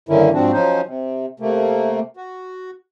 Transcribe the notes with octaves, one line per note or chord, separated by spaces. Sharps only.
G2 D3 D#3 A#3 C#4 E4
G#2 F3 C4 D4 F#4
F3 F#3 C#4 D#4 C5
C3
C3 A3 A#3
F#4